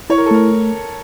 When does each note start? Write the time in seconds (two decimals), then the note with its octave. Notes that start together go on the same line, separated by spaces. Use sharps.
0.10 E4 C#5
0.18 A#4
0.26 A4
0.31 A3 A#4